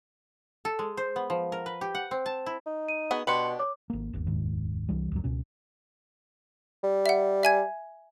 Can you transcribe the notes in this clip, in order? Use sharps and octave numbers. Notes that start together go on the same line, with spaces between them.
A4
G#3
C5
B3
F3
A#4
B4
G4
F#5
C4
A5
E4
D#4
D#7
B3 F#4 G#4
B2 D4 G4 B4 C6 C#7 F#7
C#5 D6
G#1 A#3
D1 G1 D#2
F1 D#2 G#2 D#3
C2 E3 G3
C#2 F#2 F#3
C#2 B2 C#4
G3
E5 F#5
E5 G#5 G#6